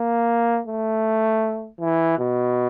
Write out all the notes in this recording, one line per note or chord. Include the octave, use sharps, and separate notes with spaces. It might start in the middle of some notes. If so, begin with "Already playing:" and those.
Already playing: A#3
A3
E3
B2